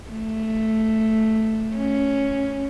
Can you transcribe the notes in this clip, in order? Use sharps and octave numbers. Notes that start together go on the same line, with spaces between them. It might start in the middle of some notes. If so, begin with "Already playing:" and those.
A3
C#4